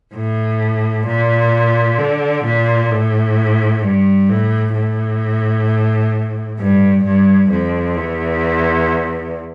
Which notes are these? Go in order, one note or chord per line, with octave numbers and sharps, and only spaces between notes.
A2
A#2
D3
A#2
A2
G2
A2
A2
G2
G2
F2
E2